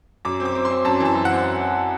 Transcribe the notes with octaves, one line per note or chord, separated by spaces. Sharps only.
F#2 D6
C4
D6
C4
C6
C4
F#2 A5
E3
A5
F#2
F#5
C4